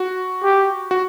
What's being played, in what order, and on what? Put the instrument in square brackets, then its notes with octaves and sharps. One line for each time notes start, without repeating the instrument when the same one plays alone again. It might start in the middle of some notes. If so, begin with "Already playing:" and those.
Already playing: [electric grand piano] F#4
[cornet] G4
[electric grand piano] F#4